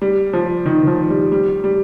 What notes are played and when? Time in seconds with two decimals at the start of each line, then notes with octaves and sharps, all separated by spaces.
0.02 G3
0.33 F3
0.66 D#3
0.83 D#3
0.87 F3
1.10 G3
1.32 G3
1.64 G3